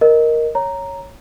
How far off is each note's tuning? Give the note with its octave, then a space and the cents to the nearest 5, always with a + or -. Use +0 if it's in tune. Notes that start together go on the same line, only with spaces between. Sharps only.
A#4 +0 D#5 +0
C#5 +0 A#5 -5